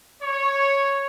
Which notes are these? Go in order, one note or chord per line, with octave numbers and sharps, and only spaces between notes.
C#5